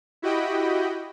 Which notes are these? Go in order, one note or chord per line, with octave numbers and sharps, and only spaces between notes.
E4 F#4 G4 D#5 G5 B5